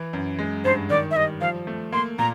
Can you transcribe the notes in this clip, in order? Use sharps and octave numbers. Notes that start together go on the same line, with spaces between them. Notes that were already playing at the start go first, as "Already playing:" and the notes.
Already playing: E3
F#2
G#3
G2 C5
D#3 D5
E5
G3 D#5
F3 F5
A3
A#3 C6
A#2 A#5